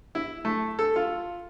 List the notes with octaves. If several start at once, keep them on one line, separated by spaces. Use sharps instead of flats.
E4
A3
A4
F4